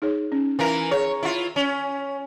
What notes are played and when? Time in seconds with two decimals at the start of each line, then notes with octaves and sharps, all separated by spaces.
0.02 D#4 G#4 C#5
0.32 C#4
0.59 E3 E4 A#4 F5
0.91 G#4 C#5
1.23 E4 F4
1.56 C#4